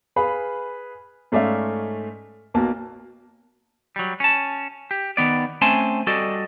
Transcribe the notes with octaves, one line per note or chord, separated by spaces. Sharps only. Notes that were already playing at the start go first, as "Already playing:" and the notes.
G#4 B4 F5 B5
G#2 A3 C#4 D5 E5 F5
B1 B2 A#3 A5
F#3 G3
C#4 A5
G4
D#3 B3 D5
A3 C4 C#4 G#5 A5 C6
G3 F#4 A4 D5 D#5